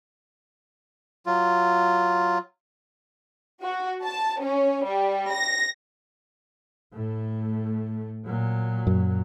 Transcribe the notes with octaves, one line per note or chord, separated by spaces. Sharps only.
F#3 F4
F#4
A5
C#4
G3
A#6
A2 A3
A#2 F#3
F#2